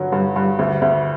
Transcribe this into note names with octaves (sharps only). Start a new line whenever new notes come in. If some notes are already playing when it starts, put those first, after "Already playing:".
Already playing: G2 D3 F#3
G2
G2
D2
D2